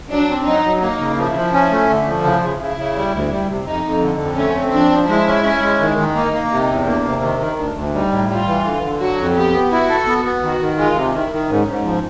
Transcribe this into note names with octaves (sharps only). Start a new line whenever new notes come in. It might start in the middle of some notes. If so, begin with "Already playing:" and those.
F#3 D4
C4
F#3 D#4
F#3
A#3 D#4
C#3
F3 E4
F3
C#4
A3
D3
F3
C#3 E4
C#3
C#3 E4
C#3
G3
D2
G3
C3
F2 D#4
F2
D3
F2
A3 C#4
C4
F3 D4
F3
G#3 E4
C#4
C#4
G#3
D#3
D#3
A#3 D#4
A#3
C3 D#4
E2
A#3 D4
C3
D#3
D#3
D2 D4
D2
G3 D#4
A2
G3 F4
E3
D3
D3
F#3 F#4
F2
B3 G4
B3
E4 F#4
A4
B3
B3
D#3 F#4
D#3
G#3 F4
C3
D#3 E4
D#3
G#2 C#4
G#2
F3